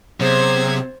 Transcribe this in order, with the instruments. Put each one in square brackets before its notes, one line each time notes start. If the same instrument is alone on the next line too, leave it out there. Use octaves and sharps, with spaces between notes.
[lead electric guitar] C3 [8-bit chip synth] F#3 B3 G#4 [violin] C5 G#6